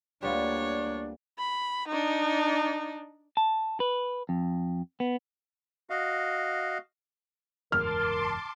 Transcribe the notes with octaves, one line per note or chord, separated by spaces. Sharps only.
D2 G3 A#3 B3 D4 F4 C#5
B5
D4 D#4
A5
B4
F2
B3
F#4 D#5 F5
F#1 E2 G#2 A#4 A5 C6 D6 F6